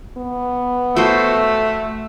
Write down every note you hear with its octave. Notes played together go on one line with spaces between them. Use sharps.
B3
A3 F#4 A4 C5